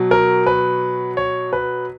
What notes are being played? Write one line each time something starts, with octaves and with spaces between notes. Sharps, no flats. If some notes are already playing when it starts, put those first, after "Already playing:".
Already playing: B2 F#3
A#4
B4
C#5
B4